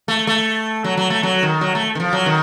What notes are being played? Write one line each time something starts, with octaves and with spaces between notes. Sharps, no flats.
A3
A3
F#3
F#3
A3
F#3
D#3
F#3
A3
D#3
F3
F#3
D#3